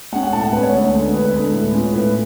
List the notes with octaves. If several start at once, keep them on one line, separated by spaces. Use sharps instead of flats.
G#3 C#4 F#5
F#5
A2 A5
F#5
G#3 C#4 B4
C#5
D2
D3 G#3
D2 B4
D3 G#3
A2
G#3 C#4 F4
A2 B4